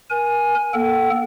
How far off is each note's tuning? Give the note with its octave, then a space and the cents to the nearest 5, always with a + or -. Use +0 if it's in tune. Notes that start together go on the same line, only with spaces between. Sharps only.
A#4 +30 G#5 +0
A#3 +30 A4 +5 G5 -40